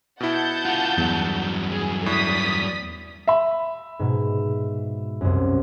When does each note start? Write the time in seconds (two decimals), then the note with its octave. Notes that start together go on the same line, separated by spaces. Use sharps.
0.20 B2 E4 F#5 A5 G6
0.66 F4 G#4
0.98 E2 G2 F#3
1.70 G#4
2.06 A2 D5 D#6 B6
3.27 E5 B5
3.99 G#2 B2 G#3
5.21 C2 F#2